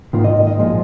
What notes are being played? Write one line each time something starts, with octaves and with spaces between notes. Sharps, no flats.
G#2 D#3 A#3 F4
D#5
D#5
D#5
A#2 F3 G#3